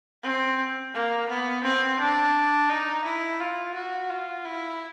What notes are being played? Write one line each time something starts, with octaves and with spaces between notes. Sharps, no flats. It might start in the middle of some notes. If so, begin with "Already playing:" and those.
C4
A#3
B3
C4
D4
D#4
E4
F4
F#4
F4
E4